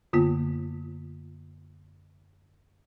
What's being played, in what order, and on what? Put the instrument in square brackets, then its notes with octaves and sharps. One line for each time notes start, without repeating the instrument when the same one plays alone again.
[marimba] F#2 D3 A#3 B3 F4